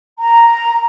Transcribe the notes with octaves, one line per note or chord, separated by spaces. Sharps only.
A#5